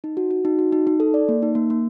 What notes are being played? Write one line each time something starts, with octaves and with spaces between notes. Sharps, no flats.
D#4
F#4
F#4
D#4
F#4
D#4
D#4
A4
D5
A#3
D#4
A#3
A#3